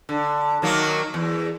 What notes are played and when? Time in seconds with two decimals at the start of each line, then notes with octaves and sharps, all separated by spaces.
0.09 D3
0.62 D#3 F#3 A#3
1.14 E2